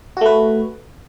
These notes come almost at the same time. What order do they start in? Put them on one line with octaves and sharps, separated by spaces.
F#4 A3 B4